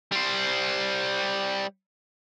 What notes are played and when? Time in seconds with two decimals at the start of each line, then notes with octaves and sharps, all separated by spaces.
0.12 G3 C5